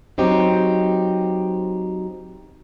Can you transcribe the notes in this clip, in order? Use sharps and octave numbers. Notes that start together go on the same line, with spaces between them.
F#3 C4 D#4 G4